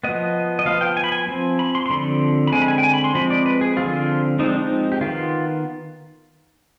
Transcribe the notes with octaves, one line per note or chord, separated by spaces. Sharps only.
F3 B3 D#5
D#5
F3 B3 F5
G5
G#5
B5
G#5
F3 C4
B5
C6
C6
D3 F3 C4 B5
B5
D3 G#3 C4 G#5
B5
G#5
G5
G#5
B5
C6
F3 G#3 C4 B5
D5
B4
G#4
D3 F3 C4 F4
F3 G#3 C4 D#4
D4
D#4
G4
D#3 B3 F4